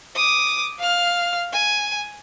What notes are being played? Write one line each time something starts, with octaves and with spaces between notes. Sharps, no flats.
D6 D#6
F5 F6
G#5